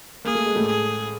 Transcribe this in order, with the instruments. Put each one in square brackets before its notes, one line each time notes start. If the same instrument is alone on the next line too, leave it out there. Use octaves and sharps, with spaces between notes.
[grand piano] A#3 [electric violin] G#4
[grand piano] A3
G#3
A2 A3
[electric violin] G#4